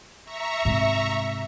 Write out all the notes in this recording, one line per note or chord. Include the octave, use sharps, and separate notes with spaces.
E5 A#5 C#6
G#2 C3